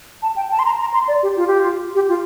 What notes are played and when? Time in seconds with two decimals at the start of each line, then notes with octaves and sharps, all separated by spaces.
0.22 A5
0.36 G5
0.51 A5
0.59 C6
0.65 A#5
0.80 A#5
0.94 C6
1.08 D5
1.23 G4
1.37 F4
1.47 G4
1.59 F4
1.95 G4
2.09 F4